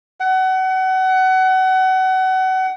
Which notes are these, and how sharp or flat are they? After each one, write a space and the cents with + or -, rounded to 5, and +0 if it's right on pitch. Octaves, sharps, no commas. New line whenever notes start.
F#5 +30